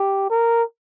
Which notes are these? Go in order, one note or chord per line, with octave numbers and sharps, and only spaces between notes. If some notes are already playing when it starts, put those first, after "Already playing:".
Already playing: G4
A#4